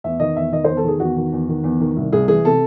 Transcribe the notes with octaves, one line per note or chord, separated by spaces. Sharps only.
E2 E5
D#3 D#5
E2 E5
D#3 D#5
E2 C5
A4
D#3 G#4
E2 F#4
D#3
E2
D#3
E2
D#3
C2
C2 G#4
E3 G#4
C3 A4